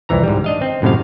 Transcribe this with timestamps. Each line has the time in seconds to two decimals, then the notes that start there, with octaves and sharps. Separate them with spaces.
0.09 C2 F2 E3 A#5
0.23 G#2 G3
0.44 D4 D#5 F5
0.61 C4 D#5
0.82 F#2 A2 C3 G#3 F5